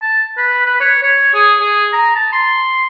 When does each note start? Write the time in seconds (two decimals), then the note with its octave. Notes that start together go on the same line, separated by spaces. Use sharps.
0.02 A5
0.38 B4
0.66 B4
0.80 C#5
1.03 C#5
1.34 G#4
1.60 G#4
1.93 A#5
2.15 A5
2.33 C6